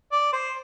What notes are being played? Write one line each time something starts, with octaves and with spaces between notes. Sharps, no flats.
D5
C5